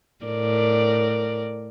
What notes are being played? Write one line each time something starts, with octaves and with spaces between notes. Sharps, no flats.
A2 A#4 D5